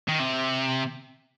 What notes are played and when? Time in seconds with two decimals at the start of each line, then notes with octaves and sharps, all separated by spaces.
0.09 D#3
0.20 C3